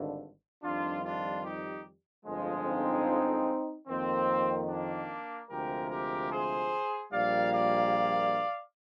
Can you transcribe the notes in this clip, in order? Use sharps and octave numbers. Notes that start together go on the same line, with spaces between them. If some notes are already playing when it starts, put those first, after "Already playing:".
Already playing: G#1 G2 D3
F2 D#3 G3 D4 F4
D4 F4
D#4 G4
G1 F2 D3 F3 G#3
C4 D#4
F2 D#3 A#3 C4
A#3 D4
D2 C3 F3 G#3 G4 A#4
G4 A#4
G#4 C5
A#1 A#2 G3 A#3 D5 F5
D5 F5